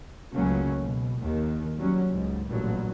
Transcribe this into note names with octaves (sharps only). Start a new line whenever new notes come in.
C#2 C#3 F#3 A3 A#3 C#4
B2
D#2 D#3
F#3 G3 C#4
C#2 G#2
A1 G2 A#2 F#3